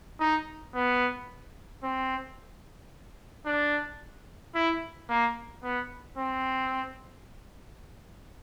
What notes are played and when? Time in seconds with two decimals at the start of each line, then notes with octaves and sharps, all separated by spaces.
0.20 D#4
0.75 B3
1.83 C4
3.46 D4
4.55 E4
5.09 A#3
5.63 B3
6.18 C4